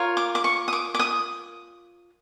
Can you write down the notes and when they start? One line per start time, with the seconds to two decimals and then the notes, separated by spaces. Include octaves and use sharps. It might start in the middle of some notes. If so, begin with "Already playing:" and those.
Already playing: F4 A#4 C#5
0.17 D6
0.35 D6
0.44 C#6
0.68 D#6
0.73 D6
0.94 D6
0.99 D#6